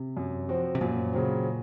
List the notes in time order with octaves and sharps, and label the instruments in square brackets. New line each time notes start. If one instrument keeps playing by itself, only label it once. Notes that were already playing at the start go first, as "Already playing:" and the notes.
Already playing: [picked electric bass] C3
[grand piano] F#2
F3 C4 F#4
[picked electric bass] C3
[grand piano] F#2 [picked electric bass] A#2
[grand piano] C#3 F#3 C4